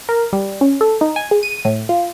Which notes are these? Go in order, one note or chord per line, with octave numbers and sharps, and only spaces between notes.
A#4
G3
C#4
A4
D#4
G#5
G#4
D#7
A2
F4